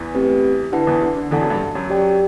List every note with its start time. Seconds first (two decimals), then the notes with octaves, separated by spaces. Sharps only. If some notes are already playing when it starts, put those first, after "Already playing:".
Already playing: E2 E3
0.14 A3 C4 G4 B4
0.72 D3 E4 B4 F#5 A5
0.87 E2 E3
1.02 D3
1.16 D3
1.31 E2 E3 D4 A4 D5 F#5 A5
1.41 F#2 F#3
1.50 G2 G3
1.75 F#2 F#3
1.90 G4 D5 G5